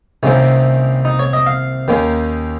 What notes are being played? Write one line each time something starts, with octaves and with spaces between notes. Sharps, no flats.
C2 C3 D#3 A#3 C#4
D#4
C#5
D#5
F5
D#2 D#3 A#3 C#4